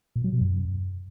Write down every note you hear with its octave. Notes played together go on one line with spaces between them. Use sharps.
A#2
F#3
B2
F#2